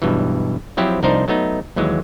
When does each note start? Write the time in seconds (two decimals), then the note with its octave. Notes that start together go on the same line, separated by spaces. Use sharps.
0.02 B1 G2 B2 E3
0.77 F3 F#3 C4 E4 G4
1.03 C2 F3 D4 D#4 A#4 C5
1.28 F#3 A3 B3 D#4
1.76 D#2 E3 F#3 G#3